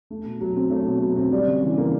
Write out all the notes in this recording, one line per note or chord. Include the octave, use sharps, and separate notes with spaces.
A3
B2
F#3
C4
A3 C#5
B2
F#3
C4
G3 D5
C#3
E3
A#3